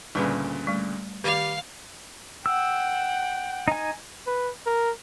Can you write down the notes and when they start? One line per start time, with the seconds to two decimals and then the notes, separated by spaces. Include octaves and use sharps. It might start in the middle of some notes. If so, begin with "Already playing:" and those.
0.15 D2 A#2 C#3 G3 B4 B5
0.67 G3 A3
1.24 D#3 G3 F5 D6
2.46 F#5 G5 E6
3.68 D#4 G#5
4.27 B4
4.66 A#4